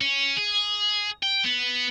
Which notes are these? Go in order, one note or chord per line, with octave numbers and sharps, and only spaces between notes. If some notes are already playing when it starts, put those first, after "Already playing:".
C#4
G#4
G5
B3